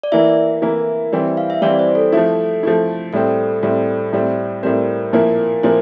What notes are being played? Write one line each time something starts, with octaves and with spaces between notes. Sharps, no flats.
D5
E3 A#3 E4 E5
E3 A#3 E4
E3 G3 C4 E4
F5
E5
E3 G3 C4 E4 D5
C5
A4
F3 A3 E4
F3 A3 E4
A2 G3 C4 A4
A2 G3 C4
A2 G3 C4
A2 G3 C4 A#4
A#2 F3 A#3 E4
A#2 F3 A#3 E4 C5